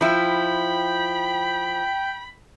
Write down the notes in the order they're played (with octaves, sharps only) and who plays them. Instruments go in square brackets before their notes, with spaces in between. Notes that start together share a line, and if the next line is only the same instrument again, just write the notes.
[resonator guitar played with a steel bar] F3 E4 [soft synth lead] G5 [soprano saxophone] B5